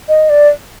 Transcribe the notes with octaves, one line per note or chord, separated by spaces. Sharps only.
D#5
D5